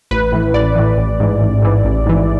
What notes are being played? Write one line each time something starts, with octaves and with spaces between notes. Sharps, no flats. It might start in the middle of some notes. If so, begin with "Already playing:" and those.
A1 B4
A2 E3
A1 D5
A2 E3
A1
G#2 E3
A1
G#2 E3
A1
G#2 E3